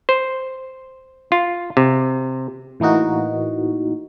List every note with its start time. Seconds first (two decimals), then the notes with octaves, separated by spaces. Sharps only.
0.09 C5
1.32 F4
1.77 C3
2.80 A2 E3 A#3 D#4 F#4